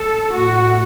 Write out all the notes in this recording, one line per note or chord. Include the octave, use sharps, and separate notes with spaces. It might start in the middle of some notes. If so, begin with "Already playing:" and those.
Already playing: A4
A2 A3 F#4